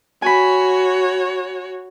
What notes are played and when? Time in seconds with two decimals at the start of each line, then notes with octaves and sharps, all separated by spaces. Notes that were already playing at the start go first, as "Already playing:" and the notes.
0.22 F#4 C#5 G#5 B5